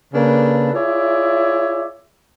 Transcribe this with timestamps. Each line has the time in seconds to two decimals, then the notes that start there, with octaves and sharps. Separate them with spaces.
0.14 C#3 A#3 D4 A4 B4
0.74 E4 F4 G#4 C#5 D5 E5